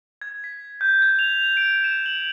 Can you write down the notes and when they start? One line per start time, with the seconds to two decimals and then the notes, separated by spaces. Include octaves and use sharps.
0.22 G#6
0.44 B6
0.81 G6
1.02 G#6
1.19 F7
1.57 D7
1.84 E7
2.06 F#7